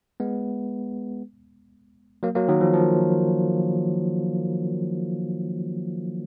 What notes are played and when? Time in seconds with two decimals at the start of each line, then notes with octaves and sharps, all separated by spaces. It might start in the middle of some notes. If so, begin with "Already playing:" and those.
0.20 G#3 B3
2.23 F#3 A#3
2.35 F#3 A#3
2.48 D#3 F#3
2.61 F3
2.74 F3